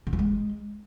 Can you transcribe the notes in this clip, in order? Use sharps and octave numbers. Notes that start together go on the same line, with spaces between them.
D3
F3
G#3